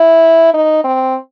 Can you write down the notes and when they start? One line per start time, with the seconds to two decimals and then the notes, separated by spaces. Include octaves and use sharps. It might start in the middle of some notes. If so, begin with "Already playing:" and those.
Already playing: E4
0.54 D#4
0.84 C4